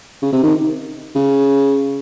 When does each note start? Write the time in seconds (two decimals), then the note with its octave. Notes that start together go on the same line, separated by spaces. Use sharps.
0.22 C#3
0.32 C3
0.43 D#3
1.16 C#3